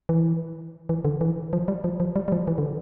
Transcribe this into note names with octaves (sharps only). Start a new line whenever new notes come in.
E3
E3
D3
E3
F3
G3
F3
F3
G3
G3
F3
E3
D3